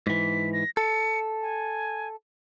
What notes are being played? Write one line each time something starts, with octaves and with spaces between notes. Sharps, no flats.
G#2 E3 B6
A#6
A4 C#7
G#5